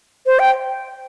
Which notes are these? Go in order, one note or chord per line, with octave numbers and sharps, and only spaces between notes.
C5
G5